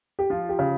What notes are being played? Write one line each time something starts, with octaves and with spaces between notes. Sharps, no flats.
G4
F3 F4
G4
C#3